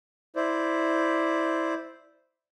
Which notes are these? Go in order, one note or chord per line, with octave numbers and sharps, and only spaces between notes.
E4 C5 D5